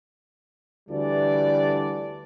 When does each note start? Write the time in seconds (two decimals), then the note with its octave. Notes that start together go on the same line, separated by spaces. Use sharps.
0.90 D2 E3 G3 F#4 A4 D5